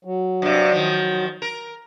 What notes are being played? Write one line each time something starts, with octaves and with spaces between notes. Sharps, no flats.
F#3
G2 C3
D#3 F3
A#4